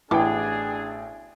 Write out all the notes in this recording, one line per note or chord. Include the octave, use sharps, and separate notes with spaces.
A1 B2 D4 E4 G#4 G5 D6